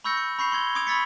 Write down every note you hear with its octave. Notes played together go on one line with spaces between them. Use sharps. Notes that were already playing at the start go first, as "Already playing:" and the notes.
B5 C#6 E6 G6 A#6 C#7
C#7
B5 C#6 G6 C7 F7
C6 C#6 G#6 G7
C6 D6 D#6 G#6 D7 F7
B5 C#6 E6 A6 B6 C#7